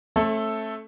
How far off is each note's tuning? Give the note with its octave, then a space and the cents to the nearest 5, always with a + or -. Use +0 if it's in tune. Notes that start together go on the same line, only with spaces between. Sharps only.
A3 +0 C#4 -45 A4 +0